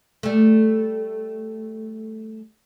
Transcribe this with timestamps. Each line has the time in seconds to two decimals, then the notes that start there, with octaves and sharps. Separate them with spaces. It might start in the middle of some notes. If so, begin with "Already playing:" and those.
0.23 G3 A3